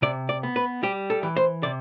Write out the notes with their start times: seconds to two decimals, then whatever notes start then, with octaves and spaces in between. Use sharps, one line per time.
0.02 C3 D5
0.29 D5
0.43 B3
0.56 B4
0.83 G3 G4
1.10 A4
1.23 E3
1.36 C5
1.63 C3 D5